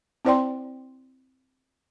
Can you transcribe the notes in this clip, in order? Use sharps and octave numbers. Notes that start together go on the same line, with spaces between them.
C4 E4 C5 D5 G5 C6